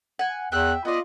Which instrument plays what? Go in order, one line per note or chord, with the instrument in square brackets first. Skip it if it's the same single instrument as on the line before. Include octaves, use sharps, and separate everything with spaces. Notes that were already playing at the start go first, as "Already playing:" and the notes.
[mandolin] F#5 G#5
[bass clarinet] E2 [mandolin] E5 G5 [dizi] F#6
[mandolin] B3 D5 [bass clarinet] F4 [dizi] D#5